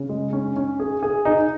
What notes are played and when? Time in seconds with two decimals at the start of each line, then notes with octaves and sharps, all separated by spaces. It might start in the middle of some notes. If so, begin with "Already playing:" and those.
Already playing: C#3
0.09 G#3
0.33 C#4
0.56 C#4
0.80 G#4
1.03 G#4
1.25 D#4